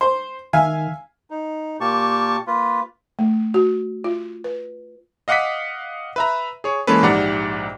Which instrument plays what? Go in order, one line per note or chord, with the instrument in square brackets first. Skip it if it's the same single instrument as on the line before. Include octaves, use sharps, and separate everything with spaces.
[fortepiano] C5
[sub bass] D#3 [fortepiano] E5 F5 G#5
[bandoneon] D#4
A#2 A#3 G4 A5 C#6
A#3 F4 B4
[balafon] A3
F#4
F4
B4
[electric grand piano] D#5 F5 F#5 D6 D#6 B6
B4 E5 A#5
G#4 C#5
E3 G#3 A#3 C#4 A4 B4
A#1 G#2 G4 D5 F#5 A#5